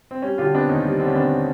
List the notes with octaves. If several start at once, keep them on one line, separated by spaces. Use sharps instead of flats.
C4
G3 C#4
D3 F4 G4
B3 C4 D4
D#2 C#4 D#4
G3
D3 C4
C#4
B3 C4 D4